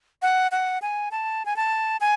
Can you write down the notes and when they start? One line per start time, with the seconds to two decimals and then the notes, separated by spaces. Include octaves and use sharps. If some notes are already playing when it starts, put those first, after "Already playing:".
0.22 F#5
0.52 F#5
0.82 G#5
1.11 A5
1.45 G#5
1.56 A5
2.01 G#5